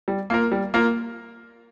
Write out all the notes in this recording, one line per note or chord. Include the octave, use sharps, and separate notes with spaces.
G3
A#3 F4 A#4
G3
A#3 F4 A#4